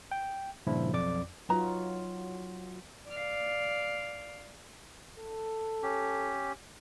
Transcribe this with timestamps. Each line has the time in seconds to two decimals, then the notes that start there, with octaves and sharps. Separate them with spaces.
0.12 G5
0.67 G2 A#2 C#3 F3 E4
0.92 B1 F2 D5 D6
1.49 F#3 D#4 F4 F#4 B4 A#5
3.09 D5 F5
5.18 A4
5.83 C#4 G4